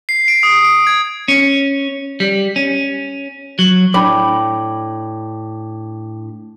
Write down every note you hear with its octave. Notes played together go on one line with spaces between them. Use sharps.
C7
D7
D#6
D7
G#6
C#4
G3
C#4
F#3
A2 D4 G5 B5 D6